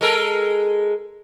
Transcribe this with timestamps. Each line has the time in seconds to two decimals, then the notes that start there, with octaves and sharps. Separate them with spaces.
0.01 G#3 A4 A#4